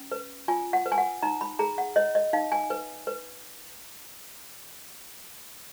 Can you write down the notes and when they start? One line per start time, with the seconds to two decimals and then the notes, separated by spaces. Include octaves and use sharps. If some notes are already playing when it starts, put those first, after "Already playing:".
Already playing: C#4
0.12 B4
0.48 F4 G#5
0.73 F#5
0.86 B4
0.92 G#5
0.98 F#5
1.23 D#4 A#5
1.41 B5
1.59 G#4 A#5
1.78 F#5
1.96 C#5 D#5
2.15 D#5
2.33 D#4 F5
2.52 G#5
2.70 B4
3.07 B4